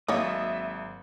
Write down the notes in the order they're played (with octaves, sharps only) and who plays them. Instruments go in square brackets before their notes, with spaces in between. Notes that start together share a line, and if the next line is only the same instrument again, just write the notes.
[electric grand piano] G#1 F#3 A6 [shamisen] A#3 D#4 C#5 [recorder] E5 [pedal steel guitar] D#6